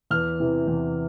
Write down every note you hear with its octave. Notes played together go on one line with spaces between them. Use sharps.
E2 F6
C3 E3
E2